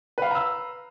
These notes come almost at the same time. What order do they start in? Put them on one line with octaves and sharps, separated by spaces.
B4 F5 B5 A#5 E6